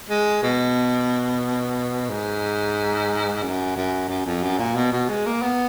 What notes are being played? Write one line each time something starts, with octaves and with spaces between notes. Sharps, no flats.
G#3
B2
G#2
F#2
F#2
F#2
F2
F#2
A#2
B2
B2
G#3
A#3
B3